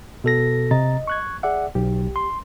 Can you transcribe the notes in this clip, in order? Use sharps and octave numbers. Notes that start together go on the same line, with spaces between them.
B2 A4 A#6
C3 D#5 A#5 A6
C#6 F#6 G#6
G#4 D5 E5 F#5
B1 G4
C6